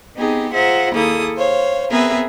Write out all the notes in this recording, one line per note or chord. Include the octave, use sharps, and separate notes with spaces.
B3 C4 D#4 G4 G#4
F4 G#4 C5 E5 F#5 A#5
D#2 A#3 E4 G#4 A4 D#6
C5 C#5 F5
B3 C4 G#4 A#4 B4 E5